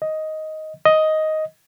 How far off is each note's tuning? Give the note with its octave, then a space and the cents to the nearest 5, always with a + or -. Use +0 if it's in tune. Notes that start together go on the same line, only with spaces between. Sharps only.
D#5 +10
D#5 +10